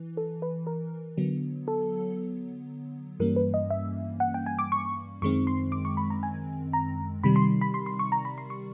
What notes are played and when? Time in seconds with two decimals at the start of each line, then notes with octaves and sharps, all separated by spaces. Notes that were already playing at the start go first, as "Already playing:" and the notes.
Already playing: E3
0.17 A4
0.42 B4
0.67 A#4
1.18 D3 F#3 B3
1.68 A4
3.20 G2 E3 G3 A#3 C#4 A#4
3.36 B4
3.54 D#5
3.70 E5
4.20 F#5
4.34 G5
4.46 G#5
4.59 D6
4.72 C#6
5.22 F#2 D#3 G#3 C4 C#6
5.47 C6
5.72 D6
5.85 C#6
5.97 B5
6.10 A#5
6.23 G#5
6.73 A#5
7.24 C3 D#3 G3 B5
7.36 C6
7.61 B5
7.74 C6
7.86 C6
7.99 C#6
8.12 A#5
8.25 B5
8.38 C6
8.50 C#6